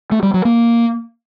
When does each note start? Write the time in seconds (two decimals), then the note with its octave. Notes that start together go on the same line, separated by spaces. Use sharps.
0.12 A3
0.23 G3
0.34 F#3
0.45 A#3